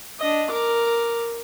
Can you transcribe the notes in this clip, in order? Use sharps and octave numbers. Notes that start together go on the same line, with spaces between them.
D4 D#5
A#4 D6